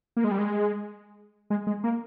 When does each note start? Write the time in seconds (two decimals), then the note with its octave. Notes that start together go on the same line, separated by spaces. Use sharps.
0.17 A#3
0.24 G#3
0.31 G3
0.38 G#3
1.50 G#3
1.67 G#3
1.84 A#3